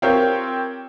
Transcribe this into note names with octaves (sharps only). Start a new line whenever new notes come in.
C4 F4 G4 A#4 C#5 G5